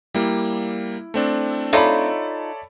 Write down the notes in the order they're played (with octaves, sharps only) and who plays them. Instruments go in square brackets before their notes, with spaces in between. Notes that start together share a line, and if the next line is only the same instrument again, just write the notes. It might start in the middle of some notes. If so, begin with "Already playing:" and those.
[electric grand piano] G3 A#3 [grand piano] E4
[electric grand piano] A3 C4 D4
[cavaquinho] D#4 F4 [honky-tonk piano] A4 B5 [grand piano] C#5 D5 E5